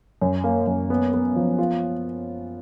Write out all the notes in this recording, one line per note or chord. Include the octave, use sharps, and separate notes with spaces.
F#2
A#3
F#2
B3
B3
F3
F4